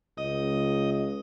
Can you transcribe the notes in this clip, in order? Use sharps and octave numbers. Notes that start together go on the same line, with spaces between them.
C#2 D#5